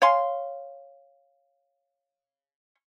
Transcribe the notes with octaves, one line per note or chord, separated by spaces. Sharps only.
C#5 F5 G#5 C6